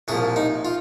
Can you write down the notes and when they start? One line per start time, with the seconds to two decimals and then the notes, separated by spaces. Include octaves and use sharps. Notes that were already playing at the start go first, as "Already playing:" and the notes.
0.08 C2 A#2 F3 G#4
0.36 D#4
0.65 F4